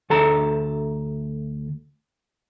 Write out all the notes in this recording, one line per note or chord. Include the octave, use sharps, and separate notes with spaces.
D2 A4 A5 A#5